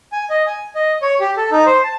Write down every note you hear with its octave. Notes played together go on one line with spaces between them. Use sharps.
G#5
D#5
G#5
D#5
C#5
G4
A4
D#4
C5
A5